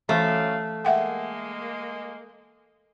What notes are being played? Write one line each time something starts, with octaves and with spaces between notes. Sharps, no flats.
F#2 E3 A3 F5
G#3 A#3 E5 F#5 G5